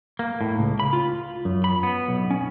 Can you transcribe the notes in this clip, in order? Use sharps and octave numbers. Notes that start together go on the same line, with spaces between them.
A#3
A2
C#2
B5
F4
F#2
B5
B3
B1
C#4